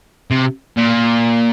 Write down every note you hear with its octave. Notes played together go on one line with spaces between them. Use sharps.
C3
A#2